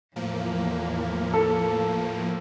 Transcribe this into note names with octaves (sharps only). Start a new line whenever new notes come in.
E2 A2 F3 A#3
A4